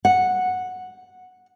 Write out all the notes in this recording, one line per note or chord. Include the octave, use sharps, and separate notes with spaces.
F#5